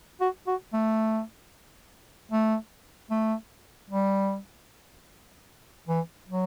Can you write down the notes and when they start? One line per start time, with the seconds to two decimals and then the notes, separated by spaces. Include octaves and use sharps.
0.21 F#4
0.47 F#4
0.73 A3
2.31 A3
3.10 A3
3.90 G3
5.88 E3
6.29 F#3